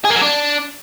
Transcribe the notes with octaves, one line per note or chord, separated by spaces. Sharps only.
G#4
A#3
F#3
D4